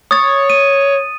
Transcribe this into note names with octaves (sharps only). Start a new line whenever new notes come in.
C#5 D#6 A6
D#7